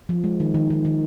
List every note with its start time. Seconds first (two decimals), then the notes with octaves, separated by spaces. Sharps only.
0.09 F3
0.24 G#3
0.40 D#3
0.54 D#3
0.70 D#3
0.85 D#3